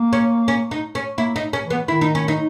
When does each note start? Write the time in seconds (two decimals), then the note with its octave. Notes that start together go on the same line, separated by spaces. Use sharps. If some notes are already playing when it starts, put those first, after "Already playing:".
Already playing: A#3
0.13 C#4
0.48 C#4
0.71 D#4
0.95 C#4
1.17 A#3 E4
1.36 D#4
1.53 C#4
1.65 E3
1.70 B3
1.88 D#3 E4
2.01 D#4
2.15 C#4
2.28 D#4